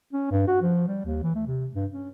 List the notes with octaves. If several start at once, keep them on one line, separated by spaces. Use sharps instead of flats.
C#4
G2
F#4
F3
G3
D#2
E3
A3
C3
G2
C#4